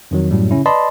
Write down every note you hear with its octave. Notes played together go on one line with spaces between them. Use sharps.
F2 D#3 F#3
F#2 A2 F#3 G3
C#3 C#4 E4
B4 D5 D#5 A5 B5 C6